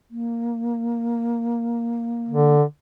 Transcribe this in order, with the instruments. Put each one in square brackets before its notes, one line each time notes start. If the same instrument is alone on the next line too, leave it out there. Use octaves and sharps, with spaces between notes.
[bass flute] A#3
[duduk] D3